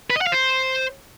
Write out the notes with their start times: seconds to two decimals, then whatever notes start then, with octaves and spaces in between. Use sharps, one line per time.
0.10 B4
0.16 D#5
0.21 F#5
0.27 F5
0.32 C5